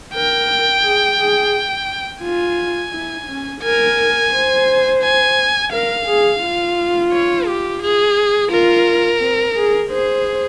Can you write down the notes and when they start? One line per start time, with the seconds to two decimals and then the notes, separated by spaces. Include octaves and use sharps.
0.14 A#4 G5
0.84 G#4
1.19 G#4
2.23 F4 G#5
2.93 E4
3.28 C#4
3.62 A#4 G#5
4.33 C5
5.02 G#5
5.72 A#4 F5
6.07 G#4
6.42 F4
7.12 C#5
7.47 G4
7.82 G#4
8.51 F4 A#4
9.20 C4
9.56 G#4
9.90 G#4 C5